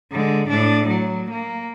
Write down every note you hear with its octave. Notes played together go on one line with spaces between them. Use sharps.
D3 G#3
A2 D4
F#3
A#3